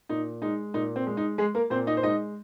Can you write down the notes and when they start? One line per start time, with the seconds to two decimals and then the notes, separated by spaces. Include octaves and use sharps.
0.09 A#2 D#4
0.42 G#3 D#4
0.74 A#2 D#4
0.96 C4
1.07 G#3
1.17 D#4
1.38 G#3 G#4
1.55 A#3 A#4
1.70 A#2 C4 C5
1.87 D#4 D#5
1.97 C5
2.03 G#3 D#4 D#5